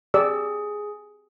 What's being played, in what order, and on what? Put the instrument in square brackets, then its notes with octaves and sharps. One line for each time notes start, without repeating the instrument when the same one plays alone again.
[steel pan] G4 D5 E6 [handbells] G#4